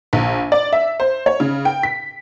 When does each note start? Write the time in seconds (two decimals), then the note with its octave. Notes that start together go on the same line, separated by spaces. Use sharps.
0.13 A#1
0.52 D5
0.73 E5
1.00 C5
1.26 C#5
1.40 C#3
1.65 G5
1.83 B6